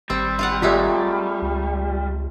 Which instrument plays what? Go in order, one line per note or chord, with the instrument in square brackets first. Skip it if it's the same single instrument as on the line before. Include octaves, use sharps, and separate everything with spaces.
[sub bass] G#1 [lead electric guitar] G3 [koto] C4
[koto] F4 F5 F#5
[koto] F#3 G#3 A3 [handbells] F4 G4 D5
[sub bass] C#2